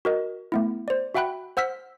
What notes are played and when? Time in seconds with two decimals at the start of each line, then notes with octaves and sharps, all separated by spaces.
0.05 F#4 A#4 D#5
0.52 A3 B3 E4
0.88 C5 D5
1.15 F#4 E5 F#5 G5 B5 F#6
1.57 C5 F#5 E6 F6 B6